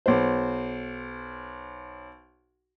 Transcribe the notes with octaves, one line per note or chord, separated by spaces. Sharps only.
B1 C5